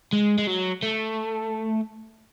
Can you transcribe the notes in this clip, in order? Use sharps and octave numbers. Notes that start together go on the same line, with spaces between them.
G#3
G#3
F#3
A3